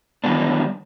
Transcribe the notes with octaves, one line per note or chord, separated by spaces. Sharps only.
D#3 E3 F#3 G3 B3 D4